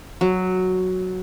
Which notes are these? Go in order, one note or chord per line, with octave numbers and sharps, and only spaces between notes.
F#3